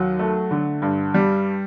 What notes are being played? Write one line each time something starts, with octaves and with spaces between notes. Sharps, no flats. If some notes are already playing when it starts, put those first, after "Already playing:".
Already playing: D#2 F#3
A3
D3
G2
G3